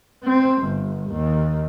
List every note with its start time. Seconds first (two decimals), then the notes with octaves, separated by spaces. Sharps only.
0.24 C4
0.62 G1
1.11 D#2